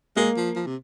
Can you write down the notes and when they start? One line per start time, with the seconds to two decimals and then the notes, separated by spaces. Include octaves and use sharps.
0.16 G#3 A#3
0.37 F3
0.56 F3
0.66 C3